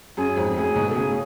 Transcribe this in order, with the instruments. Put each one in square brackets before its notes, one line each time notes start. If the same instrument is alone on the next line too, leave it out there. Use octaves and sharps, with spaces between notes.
[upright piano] F#2 [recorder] G#4
[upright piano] F2 G#2
[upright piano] F#2 A2 [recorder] G#4
[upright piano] G#2 B2
[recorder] A4
[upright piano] A2 C#3 [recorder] G#4